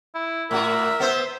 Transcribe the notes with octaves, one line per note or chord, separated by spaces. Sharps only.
E4
A2 F#4 A#4 E5
B3 C5